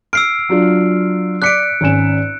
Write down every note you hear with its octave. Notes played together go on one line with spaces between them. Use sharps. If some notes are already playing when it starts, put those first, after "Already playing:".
E6 F6 C7 D7
F#3 D4 F4
D5 D6 F#6 B6 C#7 D7
G#1 C#4 E7